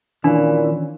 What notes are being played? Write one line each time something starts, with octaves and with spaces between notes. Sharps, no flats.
A#2 D#3 E3 C#4 D4